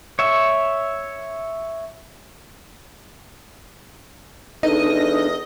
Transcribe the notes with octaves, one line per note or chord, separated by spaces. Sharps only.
C#5 E5
E2 D4 D#4 A4 D#5